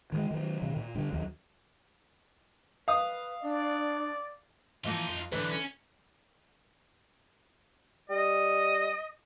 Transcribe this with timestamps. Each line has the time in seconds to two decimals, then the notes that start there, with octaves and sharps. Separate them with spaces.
0.12 D#3 E3 G#3
0.31 D#3 F#3
0.62 B2 D#3
0.76 A#2
0.95 G2 D3
1.13 D#2 F#3
2.88 B4 F5 D#6
3.42 D4 D5
4.84 E3 F3 A#3 D#4 F4
5.08 F2
5.32 B1 E2 D3 E3 B4
5.51 C#4
8.10 G3 D#5